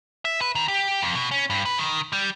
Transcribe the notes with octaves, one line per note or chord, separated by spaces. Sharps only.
E5
B4
D#3
G4
F2
B2
C#4
G2
B4
D#3
G3